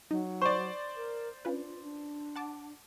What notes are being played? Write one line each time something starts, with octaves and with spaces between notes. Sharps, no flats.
F#3 D#4
C5 D5 C#6
A#4
C#4 D4 F4 B4
D4
F#5 A5 D6